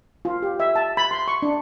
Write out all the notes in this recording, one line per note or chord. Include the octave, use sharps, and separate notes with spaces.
F4
G4
E5
A5
B5
C6
C#6
D4